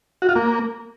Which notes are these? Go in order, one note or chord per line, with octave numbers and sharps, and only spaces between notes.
F#4
F4
A#3